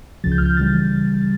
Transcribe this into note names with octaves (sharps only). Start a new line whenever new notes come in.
C#2 C#3 F3 A6
G6
F6
G6
C#3 E3 G3 A6